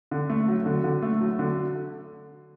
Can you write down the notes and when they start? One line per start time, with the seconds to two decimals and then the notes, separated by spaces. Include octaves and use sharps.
0.11 D3
0.30 A3
0.48 F#3
0.66 D3
0.84 D3
1.02 A3
1.21 F#3
1.39 D3